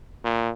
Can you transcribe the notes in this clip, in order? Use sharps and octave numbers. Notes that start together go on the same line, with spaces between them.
A#2